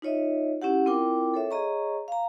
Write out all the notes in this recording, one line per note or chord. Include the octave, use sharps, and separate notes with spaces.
D#4 F4 C#5 D#5 E5
C#4 E4 G4 F#5
C4 E4 F4 A#4 G5 D6
A4 C#5 E5
G#4 C#5 D#5 A#5 C#6
F5 A#5